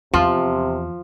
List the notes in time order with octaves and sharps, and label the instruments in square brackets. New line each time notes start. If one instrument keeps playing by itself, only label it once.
[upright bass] E2 [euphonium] C3 [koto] F3 [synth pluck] F4